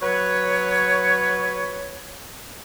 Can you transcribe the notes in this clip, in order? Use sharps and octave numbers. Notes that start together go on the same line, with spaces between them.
F#3 B4 C#5